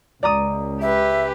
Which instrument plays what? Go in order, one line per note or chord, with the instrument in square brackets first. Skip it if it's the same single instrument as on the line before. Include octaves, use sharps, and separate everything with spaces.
[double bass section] C#2 [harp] D5 A#5 D#6
[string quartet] G4 B4 [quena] E5